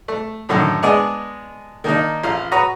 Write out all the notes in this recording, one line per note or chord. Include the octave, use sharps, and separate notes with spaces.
A3
F#2 A2 D3 D#3
G#3 B3 D4 G#4 D5 D#5
D#3 A#3 D4 D#4
A1 F4 F5
F#4 B4 C#5 A#5 D#6